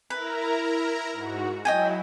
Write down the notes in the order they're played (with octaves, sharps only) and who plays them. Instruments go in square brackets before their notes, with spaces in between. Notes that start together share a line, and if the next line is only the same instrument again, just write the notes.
[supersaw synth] E4 A#4 A#5 [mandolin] B4
[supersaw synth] G#2 F#4
[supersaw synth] F#3 E4 [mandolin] D#5 G5 G#5